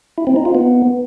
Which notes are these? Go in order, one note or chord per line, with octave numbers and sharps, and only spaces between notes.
E4
C4
D#4
F4
B3